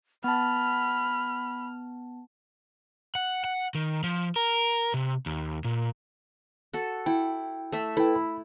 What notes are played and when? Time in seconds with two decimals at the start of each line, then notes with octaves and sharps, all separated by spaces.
0.24 B3 A5 B5 F6
3.15 F#5
3.44 F#5
3.75 D#3
4.04 F3
4.36 A#4
4.94 C3
5.26 D#2
5.64 A#2
6.73 F#4 A4
7.06 E4 G5
7.72 A3 E5
7.97 E4 A4 B4 G5
8.16 B5